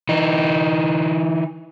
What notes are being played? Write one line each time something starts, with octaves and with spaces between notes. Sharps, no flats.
E3 D#4